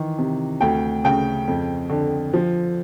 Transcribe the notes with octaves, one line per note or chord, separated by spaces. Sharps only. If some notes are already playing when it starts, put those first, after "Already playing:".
Already playing: D#3 E3
C3
D2 G5
C#3 G5
F2
D3
F3